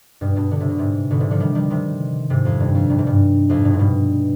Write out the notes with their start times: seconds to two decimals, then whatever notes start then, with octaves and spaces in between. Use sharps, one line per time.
0.21 G2 B2
0.36 G2 B2
0.51 D3
0.60 C3
0.70 B2
0.78 G#2 C3
1.11 B2 D3
1.20 G#2 C3
1.31 D3 F3
1.40 D#3 G3
1.55 D#3 G3
1.70 C3 D#3
2.30 G#2 C3
2.45 F2
2.60 G2
2.75 F2
2.90 G2
2.99 G#2
3.07 G2
3.49 F2 G#2
3.65 G2 B2
3.73 G#2
3.79 G2 B2